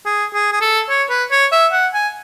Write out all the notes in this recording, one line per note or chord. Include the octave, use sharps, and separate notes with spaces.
G#4
G#4
G#4
A4
C#5
B4
C#5
E5
F#5
G#5